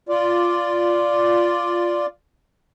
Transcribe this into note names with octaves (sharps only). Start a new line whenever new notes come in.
F4 D5